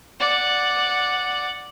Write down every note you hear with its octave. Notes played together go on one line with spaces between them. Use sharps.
D5 F#5